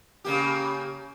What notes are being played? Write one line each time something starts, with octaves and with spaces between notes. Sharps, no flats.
C#3 A#3 G4